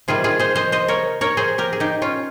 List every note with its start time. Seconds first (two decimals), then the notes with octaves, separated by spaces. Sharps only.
0.08 C3 D#3 G3 F4 G#4
0.24 F4 G#4
0.39 G#4 C5
0.55 C5 D#5
0.72 C5 D#5
0.88 A#4 C#5
1.21 A#4 C#5
1.37 G#4 C5
1.58 G4 A#4
1.73 G#4
1.80 D#4 G4
2.02 C#4 F4